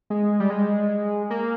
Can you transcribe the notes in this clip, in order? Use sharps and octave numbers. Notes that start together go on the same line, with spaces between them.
G#3
G3
G#3
A#3